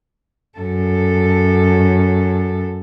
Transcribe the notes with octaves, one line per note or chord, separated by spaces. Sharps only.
F#2 A4